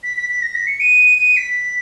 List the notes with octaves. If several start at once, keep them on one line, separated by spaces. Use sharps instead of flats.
B6
B6
B6
A#6
B6
C#7
D#7
D#7
B6